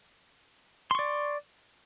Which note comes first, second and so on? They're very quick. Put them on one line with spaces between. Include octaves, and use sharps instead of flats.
C6 C#6 D5